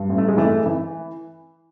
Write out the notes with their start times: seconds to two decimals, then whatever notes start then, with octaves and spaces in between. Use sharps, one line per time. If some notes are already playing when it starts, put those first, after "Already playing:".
Already playing: G2
0.09 A1
0.18 A3
0.28 G#3
0.37 E3 A3
0.66 E3